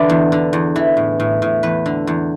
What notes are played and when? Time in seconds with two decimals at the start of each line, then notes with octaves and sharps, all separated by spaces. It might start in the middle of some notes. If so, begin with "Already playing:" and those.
Already playing: D3 E3 B4 D5
0.10 E2
0.32 D3
0.53 E2
0.76 E3
0.97 A2
1.20 A2
1.42 A2
1.63 E2 B4
1.86 D3
2.07 E2